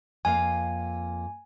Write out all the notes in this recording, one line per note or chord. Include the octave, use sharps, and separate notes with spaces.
F2 A#3 F5 G#5